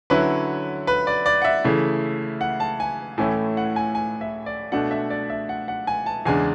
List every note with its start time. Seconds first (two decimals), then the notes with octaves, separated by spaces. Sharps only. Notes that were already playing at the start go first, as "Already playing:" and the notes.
0.10 D3 F#3 C#4 E4 B4
0.87 B4
1.07 D5
1.26 D5
1.42 F#5
1.44 E5
1.64 C#3 E3 A3
2.41 F#5
2.60 A5
2.80 G#5
3.18 A2 E3 A3 C#4 E4 G#5
3.57 F#5
3.76 G#5
3.95 G#5
4.21 E5
4.46 D5
4.72 B2 A3 D4 F#5
4.91 E5
5.10 D5
5.30 E5
5.49 F#5
5.68 F#5
5.87 G#5
6.06 A5
6.26 E2 C#3 G#3 D4 G#5